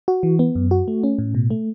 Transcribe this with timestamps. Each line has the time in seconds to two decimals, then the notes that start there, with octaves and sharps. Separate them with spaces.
0.08 F#4
0.23 E3
0.39 B3
0.55 F#2
0.71 F#4
0.88 A3
1.03 C#4
1.19 A2
1.35 B2
1.50 A3